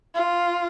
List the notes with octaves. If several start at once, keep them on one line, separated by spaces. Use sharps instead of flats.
F4